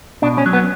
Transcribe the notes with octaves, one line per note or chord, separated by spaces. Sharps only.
B2 D4
C#4
F#3
B3